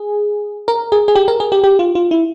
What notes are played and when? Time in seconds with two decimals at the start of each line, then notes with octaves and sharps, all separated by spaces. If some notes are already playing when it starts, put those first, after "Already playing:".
Already playing: G#4
0.68 A#4
0.92 G#4
1.08 G#4
1.16 G4
1.28 A#4
1.40 G#4
1.52 G4
1.64 G4
1.79 F4
1.95 F4
2.11 E4